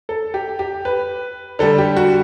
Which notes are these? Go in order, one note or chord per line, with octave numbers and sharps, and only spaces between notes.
A4
G4
G4
B4
D3 G3 A4
G4
F#4